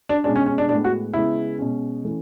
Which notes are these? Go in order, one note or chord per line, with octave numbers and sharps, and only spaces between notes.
D4
B2 G#3 C#4 D4
C#4
C#4
D4
A2 G#3 B3 D4
F#4
C#3 G#3 B3 E4
B2 G#3 C#4
E3 A3 C#4